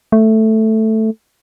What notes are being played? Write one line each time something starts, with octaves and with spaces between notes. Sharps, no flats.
A3